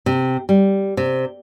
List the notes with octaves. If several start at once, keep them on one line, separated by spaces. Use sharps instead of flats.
C3
G3
C3